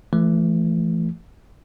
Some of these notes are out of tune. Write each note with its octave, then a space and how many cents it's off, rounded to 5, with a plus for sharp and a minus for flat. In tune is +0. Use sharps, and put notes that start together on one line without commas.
E3 +40 A3 +0